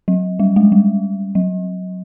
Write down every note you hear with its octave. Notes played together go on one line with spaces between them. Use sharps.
F#3
G3
G#3
G3
F#3